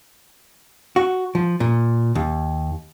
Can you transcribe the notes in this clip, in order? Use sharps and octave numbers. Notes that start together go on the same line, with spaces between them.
F#4
F3
A#2
D#2